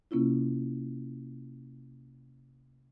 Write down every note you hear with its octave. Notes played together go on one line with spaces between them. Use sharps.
C3 A#3 C#4 E4 F4